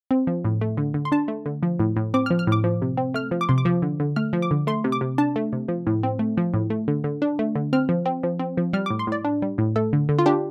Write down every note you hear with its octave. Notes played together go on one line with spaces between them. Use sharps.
C4
F3
A2
A3
D3
D3
C6
D4 A5
A3
D3
F3
A2
A2
C4 D6
F6
F3
F6
A2 D6
F3
C3
C4
A3 F6
F3
D6
C3 C6
D6
F3
D3
D3
A3 F6
F3
D6
D3
A3 C6
C3
D6
C3
D4 A5
A3
C3
F3
A2
C4
A3
F3
A2
A3
D3
D3
D4
A3
D3
C4 F6
F3
C4
F3
C4
F3
G3 F6
A2 D6
C6
A2 D5
D4
G3
A2
A3 A4
D3
D3
F4
D4 G4